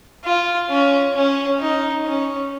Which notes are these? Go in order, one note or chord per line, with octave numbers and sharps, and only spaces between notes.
F4
C#4
C#4
D#4
C#4